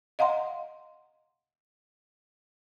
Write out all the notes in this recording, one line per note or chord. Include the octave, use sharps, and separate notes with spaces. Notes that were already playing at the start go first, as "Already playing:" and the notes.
D#5 F5 F#5 A#5 C6